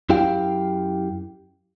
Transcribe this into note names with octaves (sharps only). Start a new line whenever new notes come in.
F#2 E4 G4 F5 G5